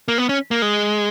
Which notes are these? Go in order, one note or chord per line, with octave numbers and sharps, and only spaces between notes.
A#3
B3
C#4
A#3
G#3